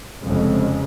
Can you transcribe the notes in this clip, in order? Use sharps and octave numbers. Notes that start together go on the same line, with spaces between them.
F1 F2 C#3 G#3